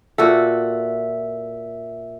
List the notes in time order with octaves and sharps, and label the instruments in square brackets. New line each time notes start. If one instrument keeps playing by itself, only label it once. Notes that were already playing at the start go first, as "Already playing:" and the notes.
[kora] A#2 F#4 A4 [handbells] E5